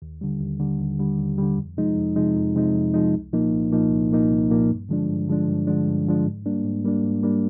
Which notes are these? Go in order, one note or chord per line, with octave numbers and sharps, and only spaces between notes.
D#2
D3 G3
D#2
D3 G3
D#2
D3 G3
D#2
D3 G3
F2
C3 F3 G#3 D#4
F2
C3 F3 G#3 D#4
F2
C3 F3 G#3 D#4
F2
C3 F3 G#3 D#4
C2
A#2 F3 A#3 D#4
C2
A#2 F3 A#3 D#4
C2
A#2 F3 A#3 D#4
C2
A#2 F3 A#3 D#4
G2
D3 F3 G#3 D4
G2
D3 F3 G#3 D4
G2
D3 F3 G#3 D4
G2
D3 F3 G#3 D4
G#2
G3 A#3 D4
G#2
G3 A#3 D4
G#2
G3 A#3 D4